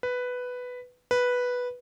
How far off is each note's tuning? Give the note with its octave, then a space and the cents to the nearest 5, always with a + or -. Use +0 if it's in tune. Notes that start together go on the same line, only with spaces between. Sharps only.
B4 +5
B4 -5